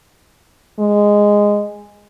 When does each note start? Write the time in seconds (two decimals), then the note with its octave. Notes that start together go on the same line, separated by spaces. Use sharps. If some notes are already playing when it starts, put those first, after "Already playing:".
0.79 G#3